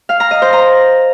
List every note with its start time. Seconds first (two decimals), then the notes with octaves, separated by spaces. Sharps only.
0.09 F5
0.20 A#5
0.31 D#5
0.42 C5
0.53 A#5